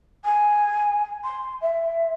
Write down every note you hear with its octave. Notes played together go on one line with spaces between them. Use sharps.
G#5
C6
E5